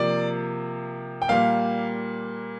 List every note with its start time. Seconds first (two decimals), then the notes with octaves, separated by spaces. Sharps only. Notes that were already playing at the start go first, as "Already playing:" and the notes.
Already playing: C3 F3 A#3 D5
1.22 G5
1.28 A#2 G3 A#3 F5